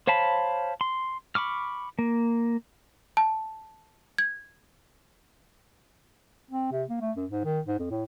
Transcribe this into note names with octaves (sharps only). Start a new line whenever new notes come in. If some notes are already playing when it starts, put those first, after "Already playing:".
C5 C#5 F5 A5 B5
C6
B5 C#6 D6 F6
A#3
A5
G#6
C4
C3
A#3
A3
F#2
G#2
D#3
G#2
F2
A2